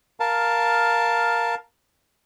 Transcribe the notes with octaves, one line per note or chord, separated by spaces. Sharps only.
A#4 F5 A5